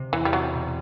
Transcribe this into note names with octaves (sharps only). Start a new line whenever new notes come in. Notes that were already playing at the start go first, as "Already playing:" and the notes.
Already playing: C3
E2 E3
G3
F#3 C4
B2